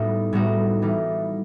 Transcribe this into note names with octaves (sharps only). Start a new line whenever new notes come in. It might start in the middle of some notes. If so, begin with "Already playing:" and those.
Already playing: A2 G3 B3 D#4 F#4
A2 G3 B3 D#4 F#4
E3 G3 D#4